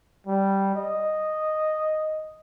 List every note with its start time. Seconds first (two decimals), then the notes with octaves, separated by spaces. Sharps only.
0.27 G3
0.76 D#5